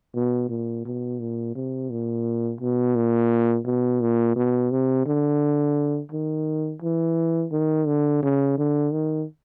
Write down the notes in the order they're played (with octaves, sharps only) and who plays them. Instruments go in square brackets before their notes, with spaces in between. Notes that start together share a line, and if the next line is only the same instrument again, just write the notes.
[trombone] B2
A#2
B2
A#2
C3
A#2
B2
A#2
B2
A#2
B2
C3
D3
D#3
E3
D#3
D3
C#3
D3
D#3